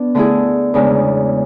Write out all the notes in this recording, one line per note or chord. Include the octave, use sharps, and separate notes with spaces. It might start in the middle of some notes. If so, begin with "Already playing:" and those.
Already playing: B3 D4
D3 A3 E4 G#4
E2 C#3 G#3 D4